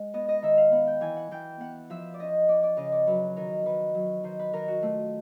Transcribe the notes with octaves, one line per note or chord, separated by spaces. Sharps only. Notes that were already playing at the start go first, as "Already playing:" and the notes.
Already playing: G#3
B3 D#5
D#5
D#3 E5
F5
B3 F#5
G5
E3 G#5
F#5
E3 G5
B3 F#5
F3 E5
D5
C#4 D#5
C#4 D5
D5
C#3 D#5
D5
F#3 B4
D#3 A#4
D#3 B4
F#3
D#3 C5
B4
D#3 A#4
F#4
A3 F4